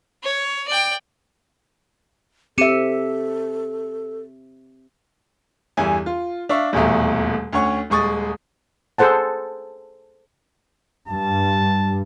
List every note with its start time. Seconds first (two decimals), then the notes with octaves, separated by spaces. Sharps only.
0.23 C#5
0.68 D5 G5
2.58 C4 G4 A4 E5 C#7 D#7
5.77 G1 E2 E3 G3 G#5
6.06 F4
6.49 D4 E5 F5 C#6
6.73 D#1 E2 B2 A3 A#3
7.53 D2 C#4 C#5 F#5 C#6
7.90 D#1 G#3 C#6 D#6 A6
8.98 G#4 A4 C5 F#5 A5
11.08 G2 A5